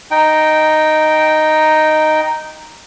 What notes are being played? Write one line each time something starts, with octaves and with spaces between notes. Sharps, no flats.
D#4 G5